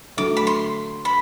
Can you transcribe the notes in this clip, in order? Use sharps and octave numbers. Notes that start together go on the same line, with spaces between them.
D3 F#3 A3 D6
B5
C6
B5